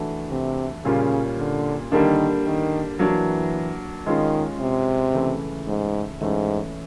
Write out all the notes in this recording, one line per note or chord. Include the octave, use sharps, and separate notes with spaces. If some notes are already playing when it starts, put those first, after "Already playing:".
Already playing: E3 A3 D4 F#4
C3
A#2 C#3 G3 A#3 C#4 F4
D3
D3 D#3 G3 A#3 D4
D#3
E3 F#3 A#3 D4
D#3 G#3 C#4 F4
C3
C#3 E3 A3
G#2
G#2 E3 A3 C#4